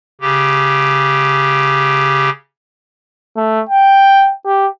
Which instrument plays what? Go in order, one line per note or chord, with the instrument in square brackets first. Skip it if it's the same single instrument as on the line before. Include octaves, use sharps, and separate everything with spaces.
[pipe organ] C#3 G4
[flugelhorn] A3
G5
G4